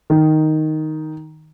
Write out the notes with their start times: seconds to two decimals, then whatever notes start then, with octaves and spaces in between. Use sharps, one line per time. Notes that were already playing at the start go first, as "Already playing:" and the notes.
0.10 D#3